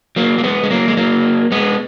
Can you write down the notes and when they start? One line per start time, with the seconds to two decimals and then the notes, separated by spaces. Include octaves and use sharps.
0.16 F#3 A#3
0.38 A#3
0.44 G#3 B3
0.63 G#3
0.70 F#3 A#3
0.88 G#3
0.97 F#3 A#3
1.52 G#3 B3